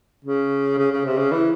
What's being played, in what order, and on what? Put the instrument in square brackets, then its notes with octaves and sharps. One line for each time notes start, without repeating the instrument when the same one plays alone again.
[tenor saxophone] C#3
C#3
C#3
C3
C#3
E3